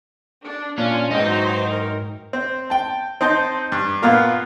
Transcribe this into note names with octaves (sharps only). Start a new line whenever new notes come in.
D4
A#2 C#4 D4 F4
G#2 E3 F#3 D#4 C5 G5
A#4
C4
G5 A5
C4 D#4 A5 C6
G2
A#2 B3 F4 A#4